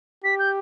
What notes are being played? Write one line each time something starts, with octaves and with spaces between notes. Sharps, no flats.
G4 B6
G6